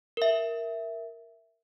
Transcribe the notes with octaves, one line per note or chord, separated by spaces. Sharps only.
A#4 E5